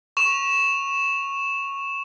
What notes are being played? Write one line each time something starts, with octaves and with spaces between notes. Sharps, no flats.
C#6 E7 F7